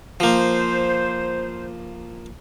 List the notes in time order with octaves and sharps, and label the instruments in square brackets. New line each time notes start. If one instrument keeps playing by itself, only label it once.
[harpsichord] F3 A#3 [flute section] C5